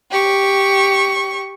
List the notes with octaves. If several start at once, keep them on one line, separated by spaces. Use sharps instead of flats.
G4 C#6